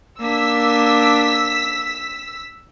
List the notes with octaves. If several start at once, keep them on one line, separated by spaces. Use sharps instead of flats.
A#3 D4 E6 B6